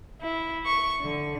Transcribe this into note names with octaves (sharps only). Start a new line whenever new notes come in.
E4
C#6
D3